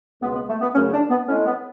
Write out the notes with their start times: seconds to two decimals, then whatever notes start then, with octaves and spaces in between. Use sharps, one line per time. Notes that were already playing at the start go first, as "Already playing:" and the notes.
0.21 C#2 B2 G#3 B3
0.35 B3
0.49 A3
0.61 B3
0.74 F#2 C#3 F#3 A3 C#4
0.93 D4
1.09 B3
1.27 A2 G#3 C#4
1.46 B3